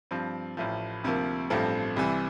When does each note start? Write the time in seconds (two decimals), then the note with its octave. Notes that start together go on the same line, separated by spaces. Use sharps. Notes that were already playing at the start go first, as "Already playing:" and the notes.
0.11 G2 F3 C4
0.57 A1 A2 F3
1.04 D2 C3 F3 A#3
1.50 A1 G2 F3 A3 C4
1.96 C2 C3 E3